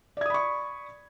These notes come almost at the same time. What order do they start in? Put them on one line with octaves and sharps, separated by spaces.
D5 G#6 D#6 B5 C#6